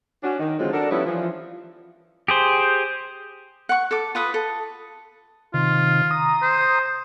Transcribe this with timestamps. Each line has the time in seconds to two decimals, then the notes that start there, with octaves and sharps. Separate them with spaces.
0.23 C#4 D4 F#4
0.39 D#3
0.59 D3 F3 F#3 G#3 C4 F4
0.73 D4 F#4 A4 A#4 D5
0.91 F3 G3 B3 C#4 E4
1.05 E3 F3
2.28 G4 G#4 C5
3.69 F#5 C#6
3.91 A4 D6
4.15 F4 B4 D#6
4.34 A4
5.54 C3 D#3 F4
6.11 A#5 D#6
6.42 C5